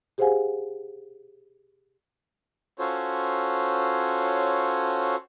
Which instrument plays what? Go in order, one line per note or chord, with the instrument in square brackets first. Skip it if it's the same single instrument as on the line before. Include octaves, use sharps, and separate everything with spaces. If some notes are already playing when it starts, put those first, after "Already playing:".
[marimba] G4 G#4 C5 F5 F#5 G#5
[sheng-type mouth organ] C#4 F4 F#4 A4 C5 C#5